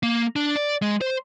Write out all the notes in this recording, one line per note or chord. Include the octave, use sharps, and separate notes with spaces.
A#3
D4
D5
G#3
C5